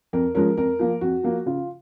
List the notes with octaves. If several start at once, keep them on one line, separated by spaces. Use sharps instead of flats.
F2 A#4
F3 G#3 C#4 A#4
F2 A#4
F3 A#3
F2 F#4
F3 A#3
C#3 F4